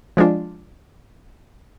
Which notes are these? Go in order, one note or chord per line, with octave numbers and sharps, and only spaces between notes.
F3 G#3 D4 F4